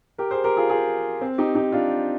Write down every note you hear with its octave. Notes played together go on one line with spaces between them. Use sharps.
G4 A#4
G#4 C5
G4 A#4
F4 G#4
F4 G#4
C4
D#4 G4
D#4 G4
D4 F4